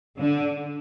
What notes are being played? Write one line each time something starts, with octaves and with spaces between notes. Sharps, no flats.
D3